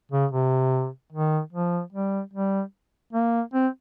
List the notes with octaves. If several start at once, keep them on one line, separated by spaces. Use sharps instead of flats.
C#3
C3
D#3
F3
G3
G3
A#3
C4